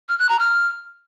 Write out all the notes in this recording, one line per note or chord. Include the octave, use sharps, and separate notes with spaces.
F6
F#6
A#5
F6